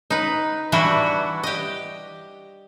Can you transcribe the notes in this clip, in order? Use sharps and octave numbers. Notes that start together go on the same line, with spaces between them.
D#4 B4
E3 G3 D4 E4 F#4
G4 D#5